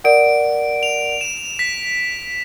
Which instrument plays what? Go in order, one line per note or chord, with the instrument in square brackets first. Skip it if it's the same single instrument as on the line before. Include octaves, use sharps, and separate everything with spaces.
[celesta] A#4 D5 F#5 [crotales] D7
[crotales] F7
E7
B6